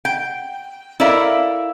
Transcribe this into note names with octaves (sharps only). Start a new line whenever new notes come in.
G5
E4 A4 A#4 D5 E5 F5